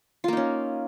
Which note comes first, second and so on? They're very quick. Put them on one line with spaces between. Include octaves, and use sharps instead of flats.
F4 A#3 D#4 C#4